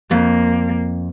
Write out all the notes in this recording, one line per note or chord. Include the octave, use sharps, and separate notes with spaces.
F2 A#3